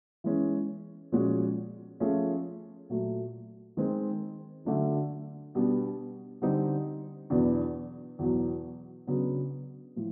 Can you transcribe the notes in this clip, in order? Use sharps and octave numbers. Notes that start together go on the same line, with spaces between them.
E3 G#3 C#4
A#2 F3 G#3 C#4 F#4
F3 A3 C#4 F4 G#4
A#2 F#3 A3
D#3 G#3 C4
D3 F#3 A3 D4 F#4
B2 G3 B3 D4
D3 G3 C4 D#4
E2 B2 F#3 B3 D4
E2 B2 F#3
C#3 F#3 B3 D4
A2 F3